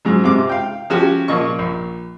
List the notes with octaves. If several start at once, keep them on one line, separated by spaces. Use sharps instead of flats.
G#2 F#3 G#3
G#2 C3 D6
F5 G5
F3 C#4 F#4 G4
A#2 F3 D#5 C#6
A#1